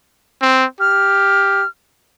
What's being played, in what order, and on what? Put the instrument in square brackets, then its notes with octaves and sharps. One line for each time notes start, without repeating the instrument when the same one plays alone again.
[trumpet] C4
[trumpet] G4 [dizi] F6